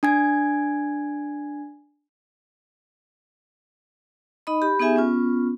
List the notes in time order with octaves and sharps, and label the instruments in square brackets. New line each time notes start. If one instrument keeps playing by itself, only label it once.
[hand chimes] D4 G#5 G#6
[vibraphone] D#4 D#5 B5
G4 B5
B3 D#4 G4 G#4 E5 G#5
B3 C#4 F4